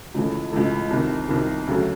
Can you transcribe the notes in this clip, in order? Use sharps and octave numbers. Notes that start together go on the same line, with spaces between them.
C#2 C#3 E3 A3
C#2 C#3 E3 A3
C2 C3 D#3
C2 C3 D#3
D2 C#3 F#3 A3